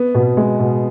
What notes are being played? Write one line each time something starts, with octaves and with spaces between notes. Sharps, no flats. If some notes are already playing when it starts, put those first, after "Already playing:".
Already playing: B3
B2
G#3
B2